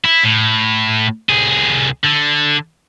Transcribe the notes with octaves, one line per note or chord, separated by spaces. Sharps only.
E4
A2
C2 G#4
D3